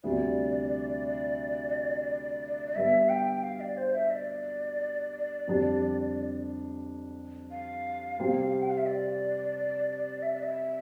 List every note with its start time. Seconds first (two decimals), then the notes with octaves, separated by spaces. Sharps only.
0.04 D2 C3 G3 D5
2.75 G2 D3 G3 B3 E5
3.09 G5
3.43 F5
3.60 D5
3.77 C5
3.94 E5
4.11 D5
5.47 F2 D3 G3 D4 G4
7.51 F5
8.19 C3 G3 C4 G4
8.61 G5
8.70 F5
8.78 E5
8.86 D5
10.22 E5
10.33 D5
10.43 E5